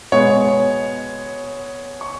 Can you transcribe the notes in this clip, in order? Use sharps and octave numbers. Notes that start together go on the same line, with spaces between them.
B2 G#3 B3 C#5
C#6